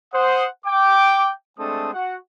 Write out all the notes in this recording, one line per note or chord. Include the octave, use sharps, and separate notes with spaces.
C5 F#5 D#6
G5 D6
G#3 A3 C4 D4 A4 D#6
F#4 F#5